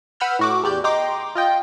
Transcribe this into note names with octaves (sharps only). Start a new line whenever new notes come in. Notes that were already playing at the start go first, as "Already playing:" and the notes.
B4 F#5 B5 E6 F6 G6
A2 F#4 D6
E2 G4 D5 G6
D#5 G5 A#5 C6 D6
F4 D#5 G5